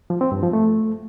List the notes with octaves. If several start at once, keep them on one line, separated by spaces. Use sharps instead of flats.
F3
C4
G2
F3
A3